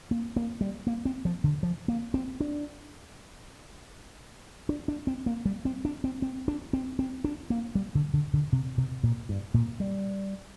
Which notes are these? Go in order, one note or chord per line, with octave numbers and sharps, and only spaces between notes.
A#3
A#3
G3
A#3
C4
F3
D3
F3
A#3
C4
D4
D4
D4
C4
A#3
G3
C4
D4
C4
C4
D4
C4
C4
D4
A#3
G3
D3
D3
D3
C3
C3
A#2
G2
A#2
G3